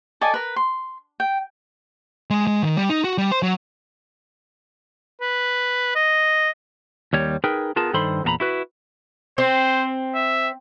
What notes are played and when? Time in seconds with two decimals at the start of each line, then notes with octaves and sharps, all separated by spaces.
0.21 A4 D5 D#5 G#5
0.34 A#4 B4
0.56 C6
1.20 G5
2.30 G#3
2.47 G#3
2.63 D#3
2.77 G3
2.89 D#4
3.04 F#4
3.18 G3
3.32 C5
3.43 F#3
5.21 B4
5.95 D#5
7.13 D#2 G3 C#5
7.44 D#4 G#4 A#4 B4 G5
7.76 B3 F4 G#4 A#4 A5
7.93 G2 D#3 A4 C5 B5 C6
8.24 E2 A#2 F#4 A#5 B5
8.40 E4 F#4 B4
9.38 C4 C5
10.14 E5